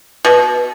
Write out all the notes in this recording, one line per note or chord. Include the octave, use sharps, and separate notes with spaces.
B2